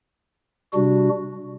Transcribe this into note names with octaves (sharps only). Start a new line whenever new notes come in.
C3 G3 D4 F#4